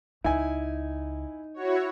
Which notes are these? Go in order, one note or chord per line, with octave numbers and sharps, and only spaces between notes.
C#2 D#4 E4 G#5
E4 F#4 C#5